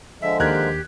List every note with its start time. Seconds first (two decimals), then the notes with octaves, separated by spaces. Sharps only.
0.21 D3 F3 G#3 E5
0.40 D#2 D4 G4 A#4 F#6 G#6